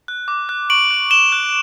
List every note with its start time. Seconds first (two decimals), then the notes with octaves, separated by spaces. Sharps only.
0.08 F#6
0.28 D6
0.49 F#6
0.70 C#6 D7 F#7
0.91 F#6
1.11 D6 E7 G7
1.32 F#6